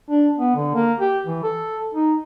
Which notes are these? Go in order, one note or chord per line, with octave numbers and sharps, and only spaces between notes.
D4
B3
D3
A#3
G4
E3
A4
D#4